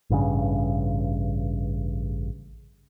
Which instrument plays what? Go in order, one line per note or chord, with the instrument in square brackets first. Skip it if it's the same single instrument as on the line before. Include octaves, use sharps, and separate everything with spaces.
[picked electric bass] A1 G2 C#3